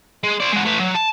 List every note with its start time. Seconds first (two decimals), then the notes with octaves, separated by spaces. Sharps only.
0.24 G#3
0.40 C5 D5
0.53 G#3 F#4
0.65 A3 B4
0.79 F#3
0.95 A5